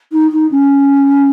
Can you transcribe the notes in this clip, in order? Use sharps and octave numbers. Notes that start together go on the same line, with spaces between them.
D#4
D#4
C#4